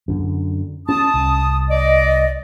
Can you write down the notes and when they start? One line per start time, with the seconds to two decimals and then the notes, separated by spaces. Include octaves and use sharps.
0.08 F#2 D3
0.89 C#4 A5 D#6
1.14 C2
1.70 D5 D#5